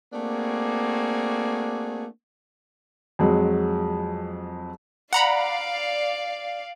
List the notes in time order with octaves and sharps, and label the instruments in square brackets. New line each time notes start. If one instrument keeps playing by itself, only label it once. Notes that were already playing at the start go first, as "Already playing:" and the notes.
[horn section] A3 A#3 C4 D4 F#4 G#4
[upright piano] F2 F#3 G#3
[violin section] D5 F5 [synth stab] F#5 A#5 B5